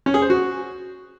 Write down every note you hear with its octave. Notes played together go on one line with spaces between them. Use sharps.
C#4
G#4
C5
F#4